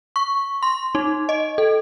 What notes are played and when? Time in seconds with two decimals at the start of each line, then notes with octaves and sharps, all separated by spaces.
0.16 C#6
0.63 C6
0.95 D#4
1.29 D#5
1.58 A4